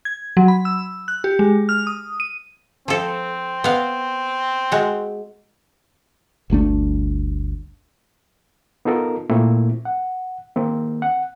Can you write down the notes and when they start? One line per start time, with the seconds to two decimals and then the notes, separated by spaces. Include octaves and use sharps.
0.05 G#6
0.37 F#3
0.48 B5
0.65 E6
1.08 F#6
1.24 G4
1.39 G#3
1.69 F6
1.87 D#6
2.20 D#7
2.88 F3 C4 A4
3.64 B3 F5
4.72 G#3 F#4
6.50 G1 D2 A3 D4
8.85 B3 D#4 F4 A4 A#4
9.30 A#2 A3 A#3 C4 E4
9.85 F#5
10.56 D#3 A#3 C4
11.02 F#5